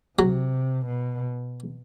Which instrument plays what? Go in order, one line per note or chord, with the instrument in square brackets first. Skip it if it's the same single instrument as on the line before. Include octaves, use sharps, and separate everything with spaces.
[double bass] C3 [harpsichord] F#3
[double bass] B2